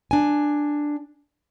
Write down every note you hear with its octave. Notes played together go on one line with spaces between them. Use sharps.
D4 G#5